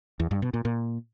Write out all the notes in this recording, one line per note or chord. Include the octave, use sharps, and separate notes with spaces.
E2
G2
B2
A#2
A#2